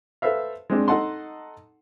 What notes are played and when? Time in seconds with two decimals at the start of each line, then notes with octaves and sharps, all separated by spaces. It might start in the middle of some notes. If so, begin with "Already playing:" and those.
0.22 A4 B4 C5 E5 F5
0.70 G#3 C4 D4
0.88 D#4 A4 D#5 F#5 A5 C6